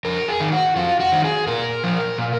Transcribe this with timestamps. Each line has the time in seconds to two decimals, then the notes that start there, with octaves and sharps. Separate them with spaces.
0.05 F2 A#4
0.28 G#4
0.40 D#3
0.52 F#4
0.76 F2 F4
1.00 F#4
1.12 D#3
1.24 G#4
1.47 A#2 A#4
1.84 F3
2.18 A#2